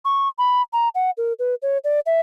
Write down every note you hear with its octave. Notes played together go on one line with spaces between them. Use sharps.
C#6
B5
A#5
F#5
A#4
B4
C#5
D5
E5